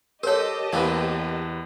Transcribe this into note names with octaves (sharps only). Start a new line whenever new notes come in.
G4 A4 A#4 C5 C#5 D#5 A5
E2 A#3 C4 B4